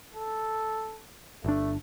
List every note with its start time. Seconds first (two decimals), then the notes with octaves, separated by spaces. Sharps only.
0.14 A4
1.44 G1 A3 D4